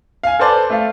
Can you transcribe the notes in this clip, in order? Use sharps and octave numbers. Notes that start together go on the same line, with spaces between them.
F5 G#5
A4 B4 C5 D5 A5
A3 F5